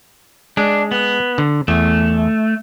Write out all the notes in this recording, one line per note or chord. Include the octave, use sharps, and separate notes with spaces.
G#3 D4
B3
D3
E2 A3